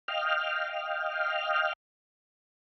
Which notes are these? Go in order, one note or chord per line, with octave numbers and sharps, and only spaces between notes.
D#5 F5 G5 F6